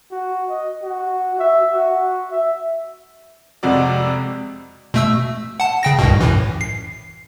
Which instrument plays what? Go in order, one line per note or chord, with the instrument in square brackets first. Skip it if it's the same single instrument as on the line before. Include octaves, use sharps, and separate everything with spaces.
[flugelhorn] F#4
D#5
F#4
E5
F#4
E5
[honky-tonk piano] F2 C3 G#3 F#4 D5
[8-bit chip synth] B2 A3 E6
F#5 A5
C#3 G5 A#6
C2 G2 B2
F#2 A2 E3
C7